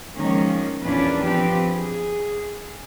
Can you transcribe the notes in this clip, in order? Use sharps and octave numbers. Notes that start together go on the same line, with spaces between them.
D#3 F3 G#3 A#3 C#4
E2 A#2 C#4 D4 B4
F3 C4 D4 G4 B4
G#4